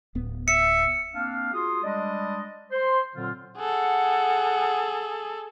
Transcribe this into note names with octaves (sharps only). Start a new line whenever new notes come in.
D1 B3
E5 C#7
A#3 C4 D4 F5
F4 F#4 G#4 C6 D#6
G3 G#3 D4 D5 D#5
C5 C6
A#2 D3 F#3 C4 F4
G#4 A4 F#5